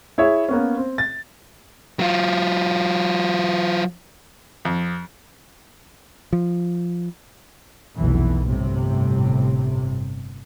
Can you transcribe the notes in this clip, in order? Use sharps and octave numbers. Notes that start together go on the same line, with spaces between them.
E4 G#4 C#5 E5
A#3 B3 C#4
C4
A6
F#3 F4
F2
F3
F1 B1 E2 E3
G1 A2 C3